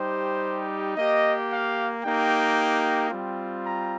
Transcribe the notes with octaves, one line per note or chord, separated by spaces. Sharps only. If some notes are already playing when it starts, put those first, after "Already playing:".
Already playing: G3 D#4 G4 C5
A#3 G4 D#5
F5
A#3 D#4 G4 G5
G3 C4 F4
A#5